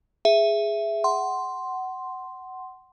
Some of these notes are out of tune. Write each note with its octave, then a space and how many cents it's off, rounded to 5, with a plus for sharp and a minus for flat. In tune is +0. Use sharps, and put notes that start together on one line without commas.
G#4 +0 E5 +10
F#5 +20 C6 +0